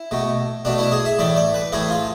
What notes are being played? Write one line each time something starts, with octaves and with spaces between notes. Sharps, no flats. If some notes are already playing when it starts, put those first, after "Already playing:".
Already playing: E4
B2 A3
B2 A3 D4
E4
G#4
E5
A2 E3 A3 D5
D5
B4
A2 E3 A3 G#4
F4